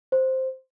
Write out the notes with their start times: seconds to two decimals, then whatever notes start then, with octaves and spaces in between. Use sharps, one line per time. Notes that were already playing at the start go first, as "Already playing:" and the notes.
0.12 C5